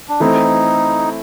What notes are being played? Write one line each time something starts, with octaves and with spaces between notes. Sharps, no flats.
D4
E3 A3 C4 D#4 E4